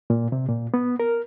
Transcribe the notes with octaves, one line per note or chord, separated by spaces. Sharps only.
A#2
C3
A#2
B3
A#4